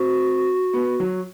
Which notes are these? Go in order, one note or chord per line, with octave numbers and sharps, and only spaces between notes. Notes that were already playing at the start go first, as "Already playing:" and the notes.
Already playing: C4 F#4
B3
F#3